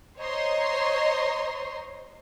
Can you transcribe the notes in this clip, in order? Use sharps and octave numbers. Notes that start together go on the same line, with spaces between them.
C5 C#5 D#5 A#5 C6